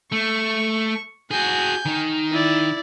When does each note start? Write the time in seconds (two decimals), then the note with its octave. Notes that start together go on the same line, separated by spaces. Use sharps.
0.12 A3 C#6
1.31 F#4 G#4 G#5 G6
1.86 D#3 D#4
2.32 E4 D5